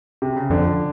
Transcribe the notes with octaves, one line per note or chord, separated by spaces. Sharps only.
C3
C#3
F2 D3